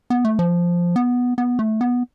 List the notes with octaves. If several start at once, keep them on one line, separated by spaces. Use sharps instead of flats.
B3
A3
F3
B3
B3
A3
B3